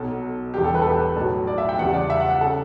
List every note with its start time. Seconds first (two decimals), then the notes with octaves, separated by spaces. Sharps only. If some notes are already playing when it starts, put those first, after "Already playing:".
Already playing: B1 B2 F#3 A4
0.54 E1 E2 B2 G3 G4
0.64 A4
0.75 B4
0.82 A4
0.89 B4
1.16 B1 A2 F#3
1.47 D5
1.58 E5
1.69 G5
1.79 E2 C#3 G3 F#5
1.94 D5
2.10 E5
2.20 F#5
2.30 F#5
2.41 C#3 A4